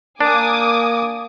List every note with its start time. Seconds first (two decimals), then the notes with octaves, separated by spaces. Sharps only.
0.21 A#3 D4 G#5 D6 D#6